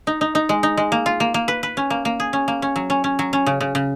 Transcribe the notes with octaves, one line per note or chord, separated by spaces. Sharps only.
D#4
D#4
D#4
G#3
D#4
G#3
A#3
F4
A#3
A#3
B4
B4
C#4
A#3
A#3
G#4
C#4
A#3
C#4
F#3
C#4
C#4
F#3
C#4
C#3
C#3
C#3